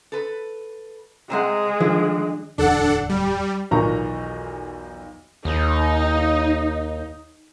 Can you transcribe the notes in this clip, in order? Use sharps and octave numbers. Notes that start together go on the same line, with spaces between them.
A4 B4
C3 G#3 C5 F#5
D3 D#3 F3
D1 E2 D4 A4 F#5
G3
B1 E2 D#3 F4 A#5 C#6
D#2 D#4